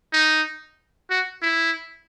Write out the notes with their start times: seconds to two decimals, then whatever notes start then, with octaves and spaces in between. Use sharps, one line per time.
0.13 D#4
1.10 F#4
1.42 E4